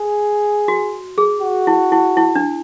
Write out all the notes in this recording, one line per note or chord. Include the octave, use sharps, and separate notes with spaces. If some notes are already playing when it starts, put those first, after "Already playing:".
Already playing: G#4
F#4
G#4
F#4
E4
E4
E4
D4